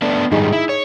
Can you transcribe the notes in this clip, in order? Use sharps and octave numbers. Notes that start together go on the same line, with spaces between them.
A3 B3 D4
G#2 D#3 G3 D#4 G#4
E4
C#5